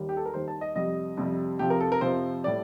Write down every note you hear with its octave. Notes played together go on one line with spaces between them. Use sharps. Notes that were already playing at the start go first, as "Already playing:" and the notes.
Already playing: D#2 D#3 G3
G4
A4
A#4
D#2 D#3 G3 C5
A5
D#5
F2 C3 G3 D#5
F2 C3 G3
F2 C3 F3 G4
A#4
A4
A#4
F2 C3 F3 C5
A2 G3 D5